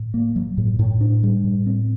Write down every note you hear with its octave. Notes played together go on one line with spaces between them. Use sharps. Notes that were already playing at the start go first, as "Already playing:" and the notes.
Already playing: A2
A#3
F#3
A2
A2
D4
G3
A2
C4